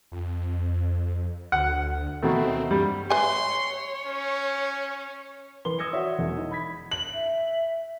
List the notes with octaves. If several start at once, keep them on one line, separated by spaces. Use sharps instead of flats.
F2
D2 F#5
B2 D#3 A3 C4
G2 G3
B4 C#5 E5 G#5 C6
C#4
E3 B4 C6 G7
D#6 E6 G#6 A#6 C#7
F#4 C#5 D5 E5 F#5
E1 E2
D#4 E4
B5 G#6 B6
F#7
E5